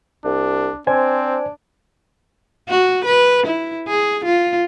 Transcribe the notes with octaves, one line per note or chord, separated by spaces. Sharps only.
C2 D4
C4 D4 C5 G#5 G#6
F#4
B4
E4
G#4
F4